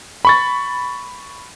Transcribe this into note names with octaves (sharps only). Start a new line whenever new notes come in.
B5 C#6 A6